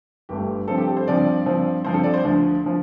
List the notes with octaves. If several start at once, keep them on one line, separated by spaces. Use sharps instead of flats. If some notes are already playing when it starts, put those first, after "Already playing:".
G1 G2 D3 A3 G4
G2 F3 C4 A4
G4
A4
C5
G2 F3 C4 D5
G2 F3 C4
G2 F3 C4 C5
A4
D5
C5
D2 D3 F3
D3 F3